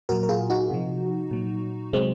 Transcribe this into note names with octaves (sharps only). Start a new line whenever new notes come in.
A#2 F#3 F#4 A#4
A#4
F4 G#4
D#4 F#4
C3 F3
A#2 F#3
C3 F#3 G#3 C4